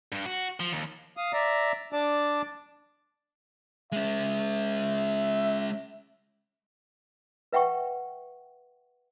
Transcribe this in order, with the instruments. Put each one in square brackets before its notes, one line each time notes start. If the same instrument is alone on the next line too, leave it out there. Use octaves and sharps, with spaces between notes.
[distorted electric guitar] G2
F#4
F3
D#2
[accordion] F5 D#6
D5 E5 A#5
D4 D5 A5 D6
[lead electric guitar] G#3 C#4 [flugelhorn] E5
[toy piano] B4 E5 F#5 G5 C#6